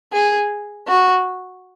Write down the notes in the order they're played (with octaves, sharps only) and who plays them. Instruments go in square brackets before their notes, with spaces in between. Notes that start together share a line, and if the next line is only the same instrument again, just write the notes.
[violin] G#4
F#4